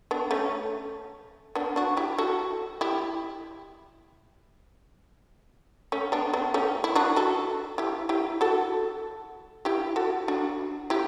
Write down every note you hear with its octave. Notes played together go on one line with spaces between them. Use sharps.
B3 D4
A3 C#4
B3 D4
D4 F#4
E4 G4
F#4 A4
E4 G4
A3 C#4
B3 D4
B3 D4
A3 C#4
E4
D4 F#4
F#4 A4
E4 G4
E4 G4
F#4 A4
E4 G4
F#4 A4
D4 F#4
E4 G4